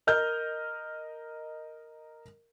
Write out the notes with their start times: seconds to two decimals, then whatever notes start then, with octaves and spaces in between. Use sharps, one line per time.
0.07 A#4 D#5 F6 G6